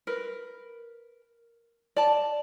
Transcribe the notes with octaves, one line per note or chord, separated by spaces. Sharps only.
A#4 B4
D5 A5